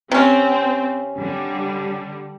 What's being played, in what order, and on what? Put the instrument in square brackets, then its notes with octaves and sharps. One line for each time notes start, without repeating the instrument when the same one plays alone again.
[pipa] C3 C#4 [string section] C4
[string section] D3 G3